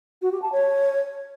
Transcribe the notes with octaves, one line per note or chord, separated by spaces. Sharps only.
F#4
G4
A5
C#5